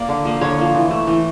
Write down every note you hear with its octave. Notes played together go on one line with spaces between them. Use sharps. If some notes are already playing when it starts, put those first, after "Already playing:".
Already playing: A#3 D5
D3
F3 A#3
D3 C#5
F3 A#3
E3
A3
E3